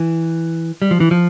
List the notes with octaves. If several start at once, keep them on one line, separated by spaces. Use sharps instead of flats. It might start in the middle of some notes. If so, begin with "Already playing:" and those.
Already playing: E3
G3
F3
E3
F3